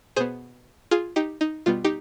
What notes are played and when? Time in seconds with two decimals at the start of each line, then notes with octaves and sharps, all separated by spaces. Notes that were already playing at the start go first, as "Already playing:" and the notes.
0.16 B2 B3 G#4 C5
0.91 F4 G#4
1.16 D#4 G4
1.41 D#4
1.66 B2 G3 B3 F4
1.84 D#4 G4